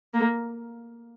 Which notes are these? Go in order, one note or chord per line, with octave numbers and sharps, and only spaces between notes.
A#3